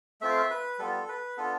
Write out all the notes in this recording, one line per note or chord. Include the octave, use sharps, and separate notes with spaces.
A3 C4 F4 E5
F5
E5
B4
G3 B3 F4 A4
B4
B3 D4 F4 A4